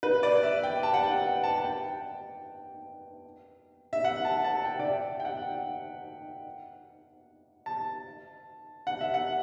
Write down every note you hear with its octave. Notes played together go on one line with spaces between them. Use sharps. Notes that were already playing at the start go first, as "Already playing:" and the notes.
B4
D5
E5
G5
A5
F#5
G5
A5
A5
G5
E5
F#5
A5
A5
G5
D5
E5
G5
F#5
A5
F#5
E5
F#5